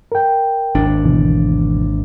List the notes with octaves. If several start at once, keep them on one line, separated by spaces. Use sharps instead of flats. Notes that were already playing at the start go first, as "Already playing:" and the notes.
A#4 G5
G#1 D#2 D4
D2 B2 E3